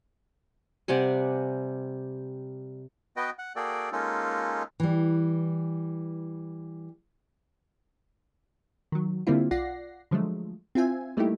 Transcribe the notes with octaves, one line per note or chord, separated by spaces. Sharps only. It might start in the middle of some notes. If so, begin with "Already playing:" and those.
C3 G3 F#5 G#5
B3 F#4 B4 D#5 G5
F#5
A#3 F#4 G#4 A4 D5 G5
G#3 A#3 C#4 D#4 F4 A4
E3 G3
D#3 F#3
D3 G3 A#3 C4 E4 F4
B1 F4 D5 F#5 A#6 C7
D3 F3 F#3 G#3 A3
C4 E4 F4 E5 G#5
G3 A3 A#3 D#4 E4 G4